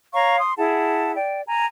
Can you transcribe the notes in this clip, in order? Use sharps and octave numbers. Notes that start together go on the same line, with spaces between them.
C#5 F5 A#5 C#6
C6 D#6
E4 G#4 F#5 A5
D5 G5
G#5 A#5